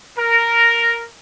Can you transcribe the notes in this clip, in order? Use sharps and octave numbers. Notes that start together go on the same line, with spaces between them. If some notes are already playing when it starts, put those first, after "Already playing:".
A#4